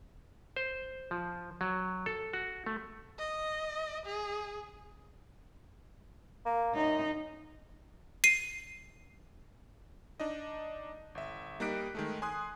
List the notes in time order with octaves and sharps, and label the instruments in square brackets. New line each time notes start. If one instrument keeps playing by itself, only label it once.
[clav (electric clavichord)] C5
F3
F#3
A4
F#4
A3
[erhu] D#5
G#4
[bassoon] A#3
[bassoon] F#2 [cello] D#4
[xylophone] C7 D#7
[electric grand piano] D4 D#4 D#5
G1 E5
G3 A#3 D#4 F#6 B6 D7
D#3 G#3 A3
G#5 C6 D#6 F#6